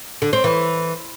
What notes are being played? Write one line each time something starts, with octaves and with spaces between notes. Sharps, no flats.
D3
C4
E3